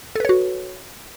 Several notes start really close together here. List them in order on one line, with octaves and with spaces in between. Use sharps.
A4 B4 C#5 F#4